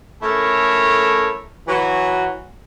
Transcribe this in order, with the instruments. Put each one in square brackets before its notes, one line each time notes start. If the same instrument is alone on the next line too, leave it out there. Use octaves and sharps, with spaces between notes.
[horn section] A3 C#4 E4 A4 A#4 C#5
E3 F#3 F#4